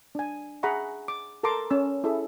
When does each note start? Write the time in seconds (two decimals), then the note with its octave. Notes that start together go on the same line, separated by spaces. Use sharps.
0.15 D4 G#5
0.63 G#4 E5 F#5 A#5 B5 C#6
1.08 D6
1.43 A4 A#4 A5 A#5 C6 D6
1.70 C#4 E6
2.04 E4 G#4 A4 E5